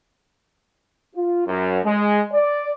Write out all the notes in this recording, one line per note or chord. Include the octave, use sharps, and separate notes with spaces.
F4
F#2
G#3
D5